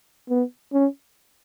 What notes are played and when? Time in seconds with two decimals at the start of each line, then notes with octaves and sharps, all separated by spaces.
0.30 B3
0.73 C#4